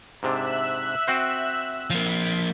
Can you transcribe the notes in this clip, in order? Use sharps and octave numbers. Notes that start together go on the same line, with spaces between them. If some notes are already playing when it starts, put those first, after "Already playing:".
G#2 C3 D4 E5 E6 F#6
C4 F#4 C5
F3 A#3 B6 D7